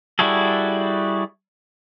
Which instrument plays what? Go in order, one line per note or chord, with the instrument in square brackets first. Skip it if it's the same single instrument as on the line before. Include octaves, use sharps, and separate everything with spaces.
[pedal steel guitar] G3 E4 F#4 G#4 A4